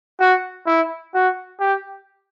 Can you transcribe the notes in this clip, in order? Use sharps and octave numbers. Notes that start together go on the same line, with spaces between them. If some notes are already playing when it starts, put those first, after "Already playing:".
F#4
E4
F#4
G4